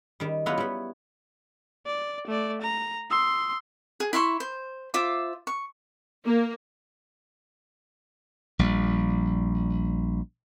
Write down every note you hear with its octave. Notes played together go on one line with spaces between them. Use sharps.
D#3 G3
F#3 B3 E4 F4 B4 C#5
G3 B3
D5
A3 D5
A#5
C6 D#6 E6
G#4
E4 E5 C6 C#6
C5
F4 C5 E5 D6
C#6
A#3
A#1 G3